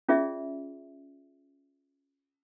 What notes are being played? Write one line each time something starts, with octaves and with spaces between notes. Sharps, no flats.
C#4 F4 G#4 D5 E5